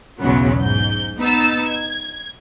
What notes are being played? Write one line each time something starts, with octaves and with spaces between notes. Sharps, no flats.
B1 E2 C#3 F#3 B3
G#2 G6
B3 D#4 E6 A6
G#6